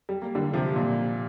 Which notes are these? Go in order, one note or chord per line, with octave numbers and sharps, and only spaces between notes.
G3
A#3
D3 G3
C3 F3
A#2